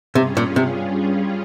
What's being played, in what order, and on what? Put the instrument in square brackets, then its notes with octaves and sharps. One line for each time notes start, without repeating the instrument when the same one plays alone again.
[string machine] G2 G3 C#4 F4 G#4 [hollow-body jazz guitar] C3
[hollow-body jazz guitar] A#2
C3